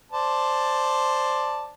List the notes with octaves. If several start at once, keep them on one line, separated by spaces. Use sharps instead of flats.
C5 D5 A5